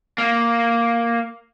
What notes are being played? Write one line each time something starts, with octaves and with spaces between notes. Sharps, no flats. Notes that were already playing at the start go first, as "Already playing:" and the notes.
A#3